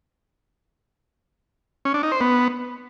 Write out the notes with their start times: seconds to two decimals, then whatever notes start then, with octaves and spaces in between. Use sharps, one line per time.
1.85 C#4
1.94 D4
2.03 D#4
2.12 C5
2.21 B3